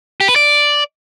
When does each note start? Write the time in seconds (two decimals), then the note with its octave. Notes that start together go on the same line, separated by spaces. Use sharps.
0.21 G4
0.28 B4
0.36 D5